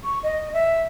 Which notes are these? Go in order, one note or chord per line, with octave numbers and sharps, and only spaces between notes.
C#6
D#5
E5